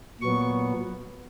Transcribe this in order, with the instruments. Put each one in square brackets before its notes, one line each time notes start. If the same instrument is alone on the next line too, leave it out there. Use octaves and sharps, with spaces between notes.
[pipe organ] A#2 F#3 B3 C#6